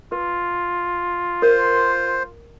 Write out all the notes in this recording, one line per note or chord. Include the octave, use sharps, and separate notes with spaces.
F4 B4
A#4 C5